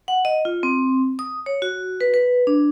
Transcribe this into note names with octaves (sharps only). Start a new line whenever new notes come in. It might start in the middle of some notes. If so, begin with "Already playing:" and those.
F#5
D#5
F4
C4
D#6
C#5
F#4
B4
B4
D4